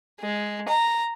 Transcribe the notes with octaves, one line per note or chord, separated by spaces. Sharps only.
G#3
A#5